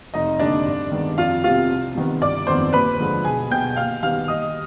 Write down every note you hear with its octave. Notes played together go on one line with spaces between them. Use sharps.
F1 D#4 D#5
D#2 D3 D4 D5
G2
D#3 G#3 B3
F2 F4 F5
C3 G3 B3 F4 F5
C2
C3 D#3 B3
G1 D5 D6
F2 D#3 B3 C5 C6
D#2 B4 B5
D3 F3 G#3
B1 G#4 G#5
B2 B3 G5 G6
D#2 F5 F6
D#3 G3 B3 F5 F6
D#2 D#5 D#6